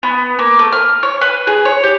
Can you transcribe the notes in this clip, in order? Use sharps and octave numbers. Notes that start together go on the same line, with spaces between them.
B3
A#3
A3
F6
C#5
B4
G#4
C#5
G4